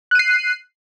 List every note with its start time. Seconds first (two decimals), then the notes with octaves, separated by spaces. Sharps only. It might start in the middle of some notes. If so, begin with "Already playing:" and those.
0.11 F#6
0.15 D#7
0.19 C7